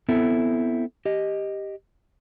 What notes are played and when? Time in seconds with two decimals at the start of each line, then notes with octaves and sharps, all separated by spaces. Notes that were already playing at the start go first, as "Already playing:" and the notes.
0.09 B3 C4 E4 A4
1.05 G4 D#5